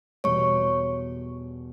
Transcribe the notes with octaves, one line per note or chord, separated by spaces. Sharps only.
E2 B2 G3 C#5 C#6